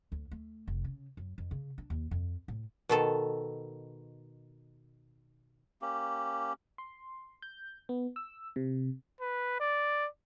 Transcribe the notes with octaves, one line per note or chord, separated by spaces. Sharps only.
D2
A3
F1
C#3
F#2
F2
C#3
D4
D#2
F2
A2
B2 D#3 A4
A#3 C#4 G4
C6
G6
B3
E6
C3
B4
D5